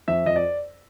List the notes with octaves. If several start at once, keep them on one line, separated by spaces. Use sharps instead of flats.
F2 E5
F2 D#5
D5